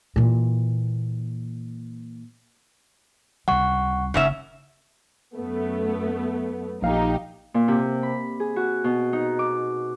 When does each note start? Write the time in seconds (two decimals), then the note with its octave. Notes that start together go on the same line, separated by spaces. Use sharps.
0.16 A#2 E3
3.48 C#2 C3 G3 F#5 C#6
4.14 F#1 G#2 C#3 C#4 E5
5.35 F#2 A3 B3
6.82 A#1 A#2 D#4 G4 F5
7.54 A#2
7.68 C3
8.03 B5
8.40 G#4
8.56 F#4
8.84 B2
9.13 D#4
9.39 D6